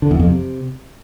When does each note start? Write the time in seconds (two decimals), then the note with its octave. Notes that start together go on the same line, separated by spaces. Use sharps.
0.02 D3
0.11 E2
0.19 F2
0.28 C3